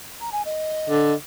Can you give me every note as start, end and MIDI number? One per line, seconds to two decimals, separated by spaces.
0.21 0.30 82
0.32 0.42 80
0.45 1.15 75
0.89 1.13 50